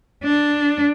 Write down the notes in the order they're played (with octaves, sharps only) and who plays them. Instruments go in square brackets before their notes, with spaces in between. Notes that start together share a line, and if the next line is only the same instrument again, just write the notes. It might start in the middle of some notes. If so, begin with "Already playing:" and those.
[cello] D4